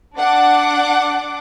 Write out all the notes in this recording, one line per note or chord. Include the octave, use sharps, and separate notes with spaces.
D4 F#5 D6